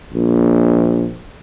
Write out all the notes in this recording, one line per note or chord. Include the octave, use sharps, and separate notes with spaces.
A#1